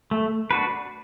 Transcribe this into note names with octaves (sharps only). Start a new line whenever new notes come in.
A3
D4 F#4 B4